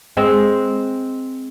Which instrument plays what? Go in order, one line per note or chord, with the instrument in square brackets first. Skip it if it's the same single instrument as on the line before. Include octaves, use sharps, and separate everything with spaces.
[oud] G#3 C4